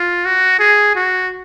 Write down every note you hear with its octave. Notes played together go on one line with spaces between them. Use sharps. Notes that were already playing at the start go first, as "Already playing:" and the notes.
Already playing: F4
F#4
G#4
F#4